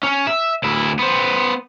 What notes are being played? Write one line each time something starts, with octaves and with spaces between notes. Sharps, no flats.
C#4
E5
D2 E4
B3 C5